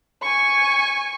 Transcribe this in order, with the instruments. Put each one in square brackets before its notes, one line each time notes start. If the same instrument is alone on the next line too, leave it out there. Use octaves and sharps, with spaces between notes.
[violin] G#5 C#6